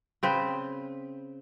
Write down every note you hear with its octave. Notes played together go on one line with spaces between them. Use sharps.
C#3 C4 B4